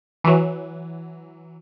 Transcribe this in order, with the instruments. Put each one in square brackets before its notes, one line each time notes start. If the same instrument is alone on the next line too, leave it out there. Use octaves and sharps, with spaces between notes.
[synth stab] E3 F#3